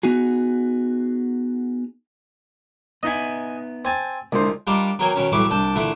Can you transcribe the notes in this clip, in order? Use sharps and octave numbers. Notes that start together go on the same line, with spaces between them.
B3 D#4 F#4 G#4
B3 D#4 D#5 E5 G#5
C4 G#5 A5
C2 D3 G#3 F4 C5
G3 A#3 D4 D#4 F4
B2 F#3 A#3 G5 G#5
B2 D#3 C#4
B1 A2 E3 G3 C#6 D6
C2 D4 G5 A5
A#2 D3 E3 A3